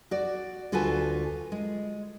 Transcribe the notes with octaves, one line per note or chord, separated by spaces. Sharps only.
F#4 D5
D2 F4 F#4 A4 B4 G#5
G#3